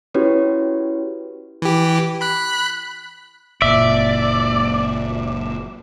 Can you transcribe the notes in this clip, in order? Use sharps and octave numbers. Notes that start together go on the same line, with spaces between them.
C#4 E4 F#4 G4 B4 C#5
E3 G4
B5 F#6 B6
F#1 A#2 D5 E5